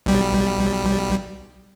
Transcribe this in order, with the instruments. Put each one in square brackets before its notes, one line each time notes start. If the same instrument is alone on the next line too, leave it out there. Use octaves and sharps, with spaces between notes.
[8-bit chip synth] B1 G3